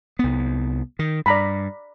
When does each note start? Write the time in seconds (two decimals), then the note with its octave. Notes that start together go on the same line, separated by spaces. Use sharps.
0.19 C2 B3
0.99 D#3
1.26 G2 D5 A#5 B5